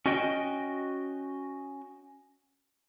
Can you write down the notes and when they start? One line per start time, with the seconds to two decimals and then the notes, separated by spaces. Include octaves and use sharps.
0.06 C#4 F#4 D#5 G5